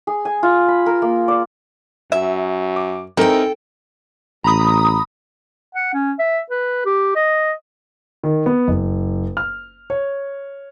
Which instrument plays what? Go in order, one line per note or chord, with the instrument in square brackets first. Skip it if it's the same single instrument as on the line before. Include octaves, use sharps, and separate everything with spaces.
[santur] G#4
G#5
F4
B5
A#4
A#3
D5
[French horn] F#2 [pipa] E5
[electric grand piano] D6
[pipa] E3 [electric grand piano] C4 D#4 A#4 [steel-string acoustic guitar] A4 G5
[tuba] A1 [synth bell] A#5 B5 D#6
[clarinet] F#5
C#4
E5
B4
G4
D#5
[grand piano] D#3
B3
F#1
F6
C#5